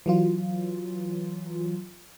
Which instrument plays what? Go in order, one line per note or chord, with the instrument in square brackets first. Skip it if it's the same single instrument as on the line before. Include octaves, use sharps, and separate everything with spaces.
[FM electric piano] E3 F#3 F4